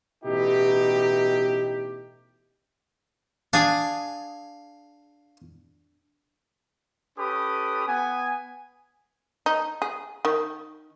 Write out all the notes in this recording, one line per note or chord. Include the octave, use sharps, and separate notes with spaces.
A1 B2 D#4 E4 G4
D4 G#4 F5
C#4 G4 A4 B4 B5 D#6
B3 G#5
D#4
G#4
D#3